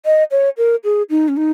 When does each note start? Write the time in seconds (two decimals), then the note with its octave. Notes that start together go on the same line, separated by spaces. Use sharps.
0.05 D#5
0.31 C#5
0.57 A#4
0.84 G#4
1.10 D#4
1.28 C#4
1.37 D#4